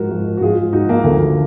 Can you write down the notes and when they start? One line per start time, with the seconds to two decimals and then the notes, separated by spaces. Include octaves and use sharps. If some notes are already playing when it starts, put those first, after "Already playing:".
Already playing: G#2 F3 F#4 A#4
0.11 G#2 F3
0.37 F#4
0.41 G#2 F3 F4 G#4
0.73 G#2 F3 D#4 F#4
0.89 A#3
1.04 D2 D3 F3 A#3